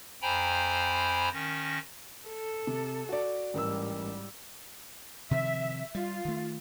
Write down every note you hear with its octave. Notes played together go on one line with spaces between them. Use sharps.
F2 C5 G5 G#5 A#5 B5
D#3 C#4 A#6
A4
C3
F#4 D5
A1 G#2 G3 A#4 E6
C3 D#3 F3 E5
G3 F4
D#3 A3